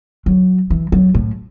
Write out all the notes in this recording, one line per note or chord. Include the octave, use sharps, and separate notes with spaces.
F#3
E3
F#3
A2